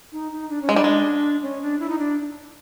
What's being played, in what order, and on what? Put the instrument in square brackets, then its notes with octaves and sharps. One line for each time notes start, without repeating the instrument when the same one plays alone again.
[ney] D#4
D#4
D4
C#4
[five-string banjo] G#3
[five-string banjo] G3 [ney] D4
[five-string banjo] G#3
[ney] C#4
D4
E4
D#4
D4